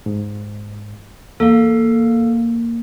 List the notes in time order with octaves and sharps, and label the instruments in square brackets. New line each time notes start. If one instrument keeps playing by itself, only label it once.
[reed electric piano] G#2
[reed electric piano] E2 [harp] A#3 [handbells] A4 F5